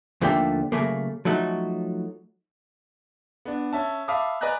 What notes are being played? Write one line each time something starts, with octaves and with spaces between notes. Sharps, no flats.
D#2 D3 F3 A3 A#3 G5
C#3 F#3 A3 A#3
F3 F#3 A3 D#4 F#4
B3 D4
C#4 E5 A5
E5 F5 A5 B5 D6 D#6
B4 D5 D#5 G#5 A#5 F#6